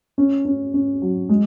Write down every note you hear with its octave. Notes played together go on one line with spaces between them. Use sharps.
C#4
C#4
C#4
F#3
G#3